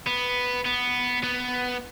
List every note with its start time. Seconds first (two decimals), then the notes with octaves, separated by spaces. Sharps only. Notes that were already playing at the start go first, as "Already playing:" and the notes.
0.07 B3
0.66 B3
1.23 B3